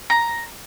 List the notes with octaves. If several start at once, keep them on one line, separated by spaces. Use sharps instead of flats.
A#5